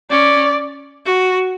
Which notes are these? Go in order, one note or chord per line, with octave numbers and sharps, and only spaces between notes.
C#4 D5
F#4